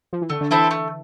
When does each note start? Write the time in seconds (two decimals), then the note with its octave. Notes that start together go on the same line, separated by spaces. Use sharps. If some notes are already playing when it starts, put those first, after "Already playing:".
0.13 F3
0.22 E3
0.30 D3 A3
0.41 D3
0.51 E3 C4 E4 A4
0.71 A3